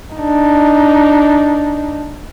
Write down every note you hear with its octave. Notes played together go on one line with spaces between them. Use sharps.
D4 D#4